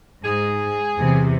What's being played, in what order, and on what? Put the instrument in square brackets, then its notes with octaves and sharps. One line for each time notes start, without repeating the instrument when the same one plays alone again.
[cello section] G#2 [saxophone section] G#4
[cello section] E2 C3